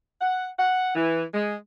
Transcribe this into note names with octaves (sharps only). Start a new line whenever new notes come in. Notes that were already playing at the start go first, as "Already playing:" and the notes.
F#5
F#5
E3
G#3